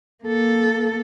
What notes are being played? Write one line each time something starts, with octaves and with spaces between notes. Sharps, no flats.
A#3 A4